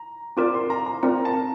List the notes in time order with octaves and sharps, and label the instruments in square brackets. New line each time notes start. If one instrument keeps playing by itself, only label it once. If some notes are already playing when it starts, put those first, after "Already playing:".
Already playing: [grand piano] A#5
[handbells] C4 F4 A#4 D5 [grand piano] D6
[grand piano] C6
A#5
A#5
[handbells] C4 F4 A#4 D5 [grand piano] A#5
[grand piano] A5